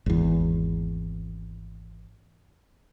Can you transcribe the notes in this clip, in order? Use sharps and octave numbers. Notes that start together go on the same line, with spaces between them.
G#1 E2